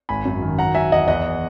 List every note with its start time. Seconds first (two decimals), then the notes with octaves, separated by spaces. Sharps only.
0.09 G#1 G#5 B5
0.25 F#2
0.42 D#3
0.59 F#3 F#5 A#5
0.75 F#3 E5 G#5
0.92 E2 D#5 F#5
1.08 E2 D#5 F#5